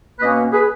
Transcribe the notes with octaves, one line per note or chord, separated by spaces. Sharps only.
B2 A#3 C#4 B4 D#5
G#4 B4